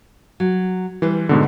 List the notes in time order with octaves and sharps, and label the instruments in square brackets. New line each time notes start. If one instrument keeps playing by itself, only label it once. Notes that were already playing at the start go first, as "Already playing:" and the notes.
[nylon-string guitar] F#3
[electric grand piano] E3 [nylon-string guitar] G3 B4 C5
[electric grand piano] G#2 B2 D3